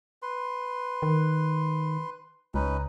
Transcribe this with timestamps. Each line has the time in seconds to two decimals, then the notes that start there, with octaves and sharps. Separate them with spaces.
0.22 B4 C6
1.02 D#3
2.54 C#2 C#4 D#4 B4